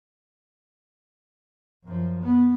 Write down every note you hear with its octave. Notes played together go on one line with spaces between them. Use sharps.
F#2 F3
B3